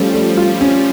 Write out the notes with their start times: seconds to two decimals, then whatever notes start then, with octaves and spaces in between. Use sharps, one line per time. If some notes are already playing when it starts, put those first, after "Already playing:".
Already playing: F3 G3 A3 C#4
0.14 A3
0.37 F4
0.61 C#4